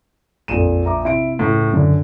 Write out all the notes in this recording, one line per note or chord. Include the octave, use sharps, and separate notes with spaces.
A#1 F2 D#7 E7
E5 A#5 D6
C3 E4 C6 D7
C#2 A2
F#2 D3